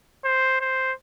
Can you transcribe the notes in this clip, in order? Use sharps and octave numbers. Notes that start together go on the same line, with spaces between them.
C5
C5